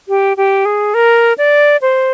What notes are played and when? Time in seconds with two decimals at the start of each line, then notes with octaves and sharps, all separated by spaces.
0.08 G4
0.37 G4
0.65 G#4
0.94 A#4
1.38 D5
1.82 C5